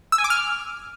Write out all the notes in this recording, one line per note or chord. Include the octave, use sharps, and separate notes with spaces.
E6
G#5
D6
F6